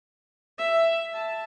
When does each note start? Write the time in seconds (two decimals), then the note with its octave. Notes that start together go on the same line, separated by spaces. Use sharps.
0.58 E5
1.14 A5